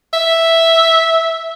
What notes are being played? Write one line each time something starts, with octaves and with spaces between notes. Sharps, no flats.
E5